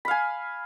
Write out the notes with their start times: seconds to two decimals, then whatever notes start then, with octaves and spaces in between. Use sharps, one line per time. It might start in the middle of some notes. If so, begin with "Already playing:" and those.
0.05 B5
0.08 F5
0.11 G#5